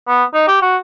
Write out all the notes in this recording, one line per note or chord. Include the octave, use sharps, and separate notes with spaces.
B3
D#4
G4
F#4